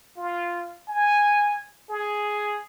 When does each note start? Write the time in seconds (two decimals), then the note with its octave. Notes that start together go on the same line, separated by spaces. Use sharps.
0.17 F4
0.88 G#5
1.90 G#4